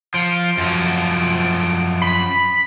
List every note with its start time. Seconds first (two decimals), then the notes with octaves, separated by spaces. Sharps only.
0.14 F3 D7
0.57 F#2 F3
2.02 B5